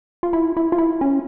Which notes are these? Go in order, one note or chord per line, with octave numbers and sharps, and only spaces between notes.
F4
E4
E4
F4
E4
C#4